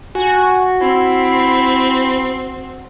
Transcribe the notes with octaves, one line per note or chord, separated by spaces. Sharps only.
F#4 G#5
C4 E4